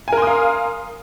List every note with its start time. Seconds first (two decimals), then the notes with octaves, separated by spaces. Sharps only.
0.08 G#5
0.13 A#4
0.17 C6
0.22 D#6
0.27 F5